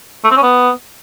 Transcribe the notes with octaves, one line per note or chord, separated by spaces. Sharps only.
A3
C4
C#4
B3